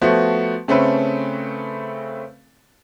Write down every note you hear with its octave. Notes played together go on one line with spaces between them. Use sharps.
F3 A3 B3 F#4
C#3 A3 C4 C#4 A4 B4